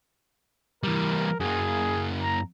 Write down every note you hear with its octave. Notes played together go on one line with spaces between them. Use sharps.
E3 G3 A#4
F#2 A#3 G#4
A#5